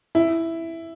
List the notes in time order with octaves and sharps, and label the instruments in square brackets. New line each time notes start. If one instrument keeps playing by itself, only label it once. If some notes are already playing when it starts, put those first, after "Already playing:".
[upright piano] E4